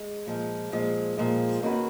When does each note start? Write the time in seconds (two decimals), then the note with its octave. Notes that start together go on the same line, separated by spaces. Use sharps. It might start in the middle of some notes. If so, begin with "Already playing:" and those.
Already playing: G#3
0.27 A#2 F3 G#3
0.72 A#2 F3 G#3
1.17 A#2 F3 G#3
1.62 D#3 A#3 C#4 F#4 B4